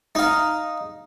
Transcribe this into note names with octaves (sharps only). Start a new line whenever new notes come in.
D#4 F5